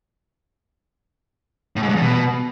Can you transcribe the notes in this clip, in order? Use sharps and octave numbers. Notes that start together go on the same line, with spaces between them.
A2
G#2
G2
E2
B2